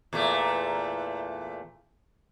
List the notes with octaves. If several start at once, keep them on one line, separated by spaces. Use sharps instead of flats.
E2 A#2 A3